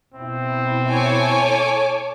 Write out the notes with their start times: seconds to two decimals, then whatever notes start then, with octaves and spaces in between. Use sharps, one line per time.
0.14 B2 C4 E4
0.90 A4 C#5 G#5 D6